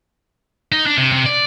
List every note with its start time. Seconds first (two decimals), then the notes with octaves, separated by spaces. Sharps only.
0.72 D#4
0.86 D4
0.98 C3
1.12 C3
1.26 D5